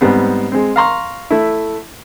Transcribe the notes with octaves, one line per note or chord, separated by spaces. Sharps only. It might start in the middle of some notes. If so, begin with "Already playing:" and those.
G#2 G3 B3 C4
G#3 C4
F5 A#5 C6 C#6
A3 E4